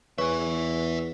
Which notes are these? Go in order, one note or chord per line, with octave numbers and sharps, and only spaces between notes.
E2 B4 C#5 E5 G#5 C#6